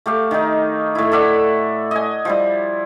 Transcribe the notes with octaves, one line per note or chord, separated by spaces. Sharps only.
A3 G4 F5
D#3 D#4
A2 E4
A4 D5 E5 F#5
D#5 G#5
F3 G3 E4